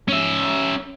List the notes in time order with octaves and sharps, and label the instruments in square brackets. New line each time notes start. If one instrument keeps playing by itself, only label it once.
[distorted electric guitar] C#4 E5